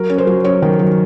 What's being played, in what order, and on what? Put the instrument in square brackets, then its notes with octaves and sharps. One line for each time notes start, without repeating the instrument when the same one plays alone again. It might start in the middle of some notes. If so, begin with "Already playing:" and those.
Already playing: [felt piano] F#3 A#4
C#4
C5
F#3
C#4 C#5
D#3
F#3